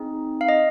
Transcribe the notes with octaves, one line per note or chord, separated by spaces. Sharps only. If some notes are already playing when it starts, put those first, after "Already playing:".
Already playing: C4 D#4 G#4
F5
D#5